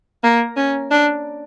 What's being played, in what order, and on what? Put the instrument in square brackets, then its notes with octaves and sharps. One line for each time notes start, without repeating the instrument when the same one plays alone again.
[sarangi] A#3
C#4
D4